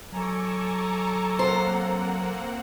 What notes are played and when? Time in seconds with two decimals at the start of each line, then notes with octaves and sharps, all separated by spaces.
0.12 F#3 A4 G#5 A#5 C#6 D6
1.39 A#3 C4 C5 F#5